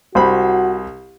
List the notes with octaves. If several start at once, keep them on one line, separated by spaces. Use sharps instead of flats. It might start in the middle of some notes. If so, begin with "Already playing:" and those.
C2 F#4 C5 B5